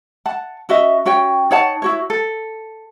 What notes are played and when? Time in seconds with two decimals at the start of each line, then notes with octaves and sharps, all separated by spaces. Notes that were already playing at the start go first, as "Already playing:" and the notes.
0.26 F#5 A5
0.69 C#4 F#4 D#5 E5
1.05 C#4 F#4 C#5 G5
1.51 D#4 C#5 F#5 A5
1.82 E4 F#4 C#5
2.10 A4